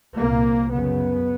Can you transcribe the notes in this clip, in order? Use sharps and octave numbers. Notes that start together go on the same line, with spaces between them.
C2 A#2 A#3
F#2 C#3 B3